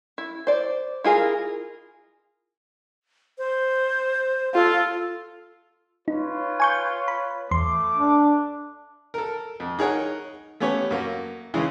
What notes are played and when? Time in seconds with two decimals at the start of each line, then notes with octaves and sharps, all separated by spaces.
0.18 E4
0.47 C5 D5
1.04 E4 F4 G#4 A#4
3.38 C5
4.55 F4 A4
6.08 D#4 F4 B4 C#5
6.60 G#5 C#6 G6
7.08 B5
7.51 E2 A3 C6 D6
7.97 D4
9.14 A4 A#4
9.60 F2
9.79 D#4 G#4 A#4 C#5 F#5
10.60 A3 B3 C#4 G4 C#5
10.91 F#2 A#3
11.54 C#3 E3 G#3 C#4